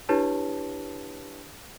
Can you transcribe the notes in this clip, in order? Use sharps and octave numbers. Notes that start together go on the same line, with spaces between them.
D4 E4 G4 B4 C#5 A5